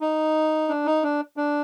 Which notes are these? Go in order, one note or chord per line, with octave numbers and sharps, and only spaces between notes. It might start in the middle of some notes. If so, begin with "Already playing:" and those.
D#4
D4
D#4
D4
D4